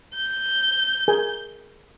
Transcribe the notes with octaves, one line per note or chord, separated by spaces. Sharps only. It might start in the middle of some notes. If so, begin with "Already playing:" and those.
G6
G#4 A#4 G#5